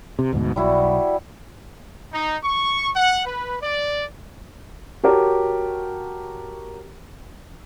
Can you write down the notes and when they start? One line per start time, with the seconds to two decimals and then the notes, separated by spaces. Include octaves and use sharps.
0.19 C3
0.33 D2 G#2 B2
0.56 B1 G3 E4 F#4
2.12 D#4
2.44 C#6
2.96 F#5
3.26 B4
3.61 D5
5.03 F#4 G4 A#4 C#5 A5